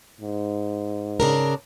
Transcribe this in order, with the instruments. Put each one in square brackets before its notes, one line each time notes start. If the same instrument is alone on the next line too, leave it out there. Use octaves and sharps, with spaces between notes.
[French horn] G#2
[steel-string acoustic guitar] C#3 D4 A#4